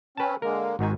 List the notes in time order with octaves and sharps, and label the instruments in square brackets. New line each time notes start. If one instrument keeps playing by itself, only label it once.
[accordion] C4 C#4 [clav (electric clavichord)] B4 A5
[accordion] D3 G#3 A#3 [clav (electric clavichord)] A#4
[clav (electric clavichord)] G#1 G#2 G#5 [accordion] D#4 F#4